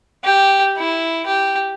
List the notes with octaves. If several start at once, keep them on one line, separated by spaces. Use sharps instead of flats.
G4
E4
G4